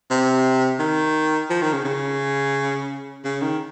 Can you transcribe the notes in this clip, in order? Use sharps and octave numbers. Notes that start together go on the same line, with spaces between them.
C3
D#3
F3
D#3
C#3
C#3
C#3
D#3